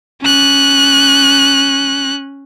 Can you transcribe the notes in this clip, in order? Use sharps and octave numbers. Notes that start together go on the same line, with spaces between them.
C#4 F#6